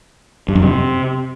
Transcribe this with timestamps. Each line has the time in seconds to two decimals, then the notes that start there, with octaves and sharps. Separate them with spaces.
0.49 G2
0.55 F#2
0.62 C3